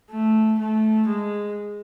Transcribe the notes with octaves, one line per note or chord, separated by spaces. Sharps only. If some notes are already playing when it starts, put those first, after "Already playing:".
A3
A3
G#3